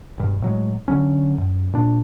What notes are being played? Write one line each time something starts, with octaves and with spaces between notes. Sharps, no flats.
E1 G2
A2 F#3 G#3
D3 F#3 C#4
F#2
A#2 D4